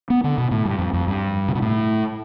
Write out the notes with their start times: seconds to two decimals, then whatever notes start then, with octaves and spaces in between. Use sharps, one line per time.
0.10 B3
0.24 D3
0.38 B2
0.51 A2
0.65 G2
0.79 F2
0.93 F2
1.07 G2
1.49 C3
1.55 B2
1.62 A2